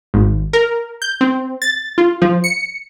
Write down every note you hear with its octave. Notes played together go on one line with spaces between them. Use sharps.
G#1
A#4
G6
C4
A6
F4
F3
C#7